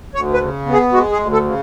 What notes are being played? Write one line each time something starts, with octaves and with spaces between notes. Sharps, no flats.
D2 C#5
B4
C#3
B3
G#4
G#3 F#4
G#4
D2
A4
C#3